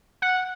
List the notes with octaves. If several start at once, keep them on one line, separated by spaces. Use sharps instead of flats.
F#5